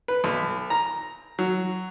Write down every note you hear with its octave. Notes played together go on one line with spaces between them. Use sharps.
B4
B1
A#5
F#3